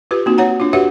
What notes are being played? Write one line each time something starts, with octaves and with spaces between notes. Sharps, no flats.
F4 G4 B4
A#3 C4 D#4 F#4
C#5 F#5 A#5
D4 F4
F#4 G4 B4 C#5 E5 F#5